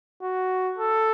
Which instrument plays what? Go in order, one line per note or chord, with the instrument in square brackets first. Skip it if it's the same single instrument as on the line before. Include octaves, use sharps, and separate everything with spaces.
[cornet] F#4
A4